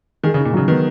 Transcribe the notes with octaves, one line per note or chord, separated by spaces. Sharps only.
D#3 G#4
C#3
D#4
A#2
C#3 F#3
D#3 B3